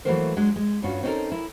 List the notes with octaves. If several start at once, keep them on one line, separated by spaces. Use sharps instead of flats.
E3 F#3 A3 A#3 A#4 C5
F#3 G#3 D4
G#3
G2 C#4 F4 F#4
C4 C#4 D#4 F4 A4 A#4
E4 A#4